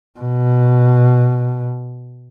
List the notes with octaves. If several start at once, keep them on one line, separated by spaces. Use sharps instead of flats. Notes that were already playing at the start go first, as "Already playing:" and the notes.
B2